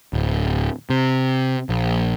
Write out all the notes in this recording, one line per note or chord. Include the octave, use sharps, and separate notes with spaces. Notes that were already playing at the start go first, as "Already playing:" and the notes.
D1
C3
A#1